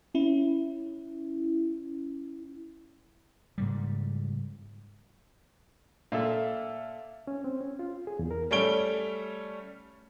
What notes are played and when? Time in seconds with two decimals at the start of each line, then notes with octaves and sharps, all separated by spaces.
0.14 C#4 E4
3.58 G#2 C#3 G3
6.12 A#2 A4 E5 F5
7.27 C#4
7.44 C4
7.61 C#4
7.79 F4
8.07 G#4
8.19 E2
8.31 A#4
8.51 G3 A3 C#4 C#5 D7 G7